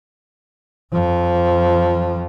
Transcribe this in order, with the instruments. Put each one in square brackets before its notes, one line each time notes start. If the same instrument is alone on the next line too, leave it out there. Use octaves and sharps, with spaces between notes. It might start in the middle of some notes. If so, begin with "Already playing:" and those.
[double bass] F2 F3